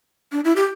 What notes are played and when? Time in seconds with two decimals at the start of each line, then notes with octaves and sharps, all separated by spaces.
0.32 D4
0.45 E4
0.56 G4